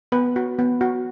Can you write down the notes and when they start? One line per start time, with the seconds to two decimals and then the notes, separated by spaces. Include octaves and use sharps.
0.12 B3 B4
0.36 F#4
0.59 B3
0.81 F#4